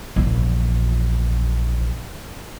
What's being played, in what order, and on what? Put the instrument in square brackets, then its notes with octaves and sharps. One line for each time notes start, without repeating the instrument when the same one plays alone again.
[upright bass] A#1 E2